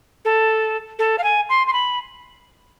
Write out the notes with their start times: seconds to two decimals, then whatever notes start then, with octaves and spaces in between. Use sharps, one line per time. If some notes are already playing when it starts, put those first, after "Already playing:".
0.25 A4
0.99 A4
1.18 F5
1.24 G#5
1.49 C6
1.67 C6
1.73 B5